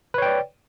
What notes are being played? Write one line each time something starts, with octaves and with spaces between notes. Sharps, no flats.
B4 C#5 D5 G5